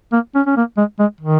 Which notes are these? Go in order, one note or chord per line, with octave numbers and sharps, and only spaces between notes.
A#3
C#4
C#4
A#3
G#3
G#3
D#3